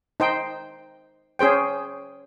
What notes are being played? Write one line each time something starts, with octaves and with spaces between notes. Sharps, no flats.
D#4 C5 G5
C#4 G#4 C5 G5